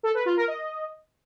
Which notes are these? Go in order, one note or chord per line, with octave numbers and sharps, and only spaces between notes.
A4
B4
F4
A#4
D#5